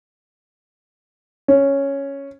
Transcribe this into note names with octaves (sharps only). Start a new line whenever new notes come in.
C#4